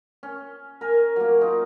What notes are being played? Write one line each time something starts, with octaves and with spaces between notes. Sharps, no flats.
C#4
A#4 G#5
F#3 A#3
D#4 F4